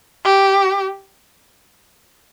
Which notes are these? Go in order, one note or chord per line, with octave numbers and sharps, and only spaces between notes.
G4